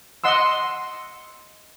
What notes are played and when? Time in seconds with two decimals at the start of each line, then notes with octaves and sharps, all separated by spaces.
0.24 D#5 F#5 C6 E6